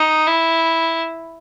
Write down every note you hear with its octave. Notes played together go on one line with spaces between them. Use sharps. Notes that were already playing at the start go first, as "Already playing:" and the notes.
Already playing: D#4
E4